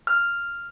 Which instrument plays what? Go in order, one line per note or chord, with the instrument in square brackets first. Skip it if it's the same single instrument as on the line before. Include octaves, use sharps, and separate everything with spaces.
[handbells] F6